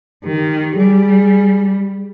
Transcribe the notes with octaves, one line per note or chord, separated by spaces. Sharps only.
D#3 G4
G3 G#4